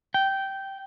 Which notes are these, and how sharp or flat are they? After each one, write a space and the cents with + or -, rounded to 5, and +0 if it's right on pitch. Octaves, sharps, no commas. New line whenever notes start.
G5 -10